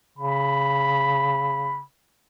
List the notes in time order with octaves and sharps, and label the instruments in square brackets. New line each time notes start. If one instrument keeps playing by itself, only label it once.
[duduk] C#3 [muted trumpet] B5